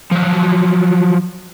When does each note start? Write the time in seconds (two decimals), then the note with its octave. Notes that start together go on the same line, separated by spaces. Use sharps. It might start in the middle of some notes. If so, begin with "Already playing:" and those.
0.11 F3 F#3